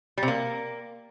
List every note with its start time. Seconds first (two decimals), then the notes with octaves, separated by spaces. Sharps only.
0.18 G3
0.23 C3
0.28 A#3